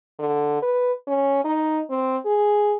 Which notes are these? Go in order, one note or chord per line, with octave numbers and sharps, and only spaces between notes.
D3
B4
C#4
D#4
C4
G#4